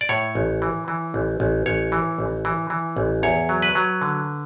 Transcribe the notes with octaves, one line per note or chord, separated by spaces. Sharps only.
D5
A2 C#5
A1
E3
E3
A1
A1
A1 C#5
E3
A1
E3
E3
A1
E2 C#5
F#3
B4
F#3
D3